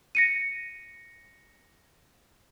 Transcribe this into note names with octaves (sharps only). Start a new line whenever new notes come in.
A#6 C#7 D#7